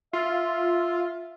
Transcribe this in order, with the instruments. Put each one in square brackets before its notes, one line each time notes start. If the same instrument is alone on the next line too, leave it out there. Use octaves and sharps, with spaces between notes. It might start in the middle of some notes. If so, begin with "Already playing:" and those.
[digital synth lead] F4 [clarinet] E5